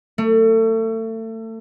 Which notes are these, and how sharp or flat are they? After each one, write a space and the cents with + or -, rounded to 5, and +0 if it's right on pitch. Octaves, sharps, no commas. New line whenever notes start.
A3 +30